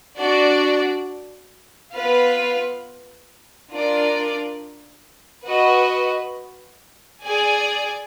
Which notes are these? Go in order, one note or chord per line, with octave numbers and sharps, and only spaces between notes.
D4 F#4 D5
B3 F4 B4 F5
D4 F4 A#4 D5
F#4 B4 D#5
G#4 D5 G#5